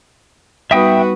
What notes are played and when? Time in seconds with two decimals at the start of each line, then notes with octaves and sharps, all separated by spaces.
0.71 G3 B3 D#4 F#4 B4 E5 G5 D#6